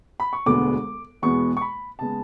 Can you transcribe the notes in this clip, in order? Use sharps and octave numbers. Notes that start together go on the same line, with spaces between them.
B5
C#6
E1 D2 D3 G#3 B3 D6
E2 B2 G#3 B3 C#6
C#6
B5
C#3 G#3 B3 A5